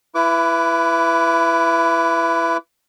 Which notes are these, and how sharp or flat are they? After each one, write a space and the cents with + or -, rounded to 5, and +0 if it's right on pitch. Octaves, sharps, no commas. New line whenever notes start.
E4 +25 B4 +0 D6 -20